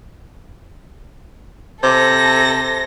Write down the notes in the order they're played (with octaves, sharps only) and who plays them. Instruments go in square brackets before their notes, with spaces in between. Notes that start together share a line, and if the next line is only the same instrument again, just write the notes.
[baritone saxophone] C3 [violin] A4 A#6